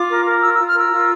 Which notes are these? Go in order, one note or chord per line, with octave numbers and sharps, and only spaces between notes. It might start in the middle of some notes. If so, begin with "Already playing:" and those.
Already playing: F4 D6
A#4
A#4
F4 E6
F4 E6
F6
A#4 E6
F4